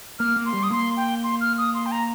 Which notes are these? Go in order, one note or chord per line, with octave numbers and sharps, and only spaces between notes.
A#3 F6
A#3
C6
G3
D#6
A#3 C6
G5
C6
F6
D#6
C6
G5
A#5